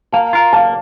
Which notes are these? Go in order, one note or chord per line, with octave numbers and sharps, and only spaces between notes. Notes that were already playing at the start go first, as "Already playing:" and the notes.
A#3 F5 A5
F4 A#4
A#3 F5 A5